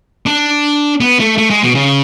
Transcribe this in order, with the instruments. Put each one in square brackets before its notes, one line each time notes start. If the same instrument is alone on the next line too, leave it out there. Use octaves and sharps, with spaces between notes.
[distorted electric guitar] D4
B3
A3
A3
G#3
B2
C#3